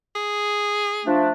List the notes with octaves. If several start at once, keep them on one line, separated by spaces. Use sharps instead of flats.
G#4
F3 A3 D4